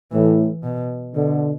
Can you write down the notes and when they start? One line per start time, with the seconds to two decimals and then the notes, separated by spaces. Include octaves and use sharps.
0.12 A2 E3
0.63 B2
1.15 B2 D3